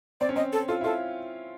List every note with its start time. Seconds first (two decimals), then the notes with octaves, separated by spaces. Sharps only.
0.21 C4 D5
0.29 C#4
0.36 C4 D#5
0.53 A4
0.68 F4 A4
0.81 E4
0.84 F4 A4